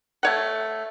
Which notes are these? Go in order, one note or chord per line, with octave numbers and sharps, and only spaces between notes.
A3 C#5 F#5